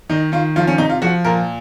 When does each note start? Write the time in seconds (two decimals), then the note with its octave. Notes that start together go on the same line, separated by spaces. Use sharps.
0.10 D#3 D#4
0.32 D#3 F4
0.56 F3 F4
0.67 C#4
0.78 C3 D#4
0.90 F4
1.02 F3 F#4
1.25 A#2 A#4